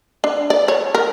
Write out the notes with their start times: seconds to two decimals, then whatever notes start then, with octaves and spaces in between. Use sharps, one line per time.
0.24 D4
0.50 D5
0.68 C#5
0.95 A#4